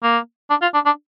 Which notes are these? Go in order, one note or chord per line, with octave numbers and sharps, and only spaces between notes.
A#3
D4
F4
D4
D4